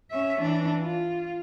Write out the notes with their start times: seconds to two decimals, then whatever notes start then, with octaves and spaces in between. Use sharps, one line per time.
0.11 C#4 E5
0.41 E3 D4
0.81 F4